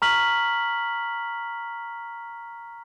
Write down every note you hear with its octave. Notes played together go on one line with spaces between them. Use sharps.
A#5 C#6 F6 B6 F#7